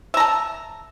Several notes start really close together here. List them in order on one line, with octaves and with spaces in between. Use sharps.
E5 A#5 A5